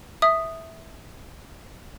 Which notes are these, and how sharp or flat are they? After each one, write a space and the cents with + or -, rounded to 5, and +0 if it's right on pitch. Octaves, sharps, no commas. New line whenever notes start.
E5 -10 D#6 -5